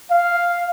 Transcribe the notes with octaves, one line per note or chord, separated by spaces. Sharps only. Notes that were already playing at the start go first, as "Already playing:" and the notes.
F5